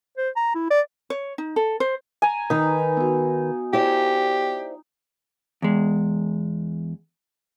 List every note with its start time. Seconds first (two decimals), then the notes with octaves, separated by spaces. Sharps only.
0.18 C5
0.37 A#5
0.55 E4
0.70 D5
1.10 C#5
1.38 D#4
1.56 A4
1.80 C5
2.22 G#5 A#5
2.50 D#3 D#4 B4
2.97 B3 F#4
3.73 E4 G4 C5 D5
5.62 E2 G#3